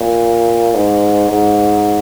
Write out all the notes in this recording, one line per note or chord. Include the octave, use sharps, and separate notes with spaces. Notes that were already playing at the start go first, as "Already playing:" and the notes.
Already playing: A#2
G#2
G#2